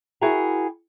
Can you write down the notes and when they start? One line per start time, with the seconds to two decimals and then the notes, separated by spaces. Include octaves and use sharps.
0.21 E4 F#4 G#4 A#4 G5 A#5